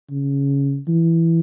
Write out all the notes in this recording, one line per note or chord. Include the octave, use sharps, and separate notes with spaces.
C#3
E3